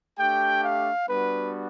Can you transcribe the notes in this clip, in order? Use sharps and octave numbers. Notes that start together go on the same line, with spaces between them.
A3 D4 G4 G5
F5
G3 B3 D4 F#4 B4